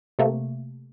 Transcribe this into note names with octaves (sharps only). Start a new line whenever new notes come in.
C3 A3 A#3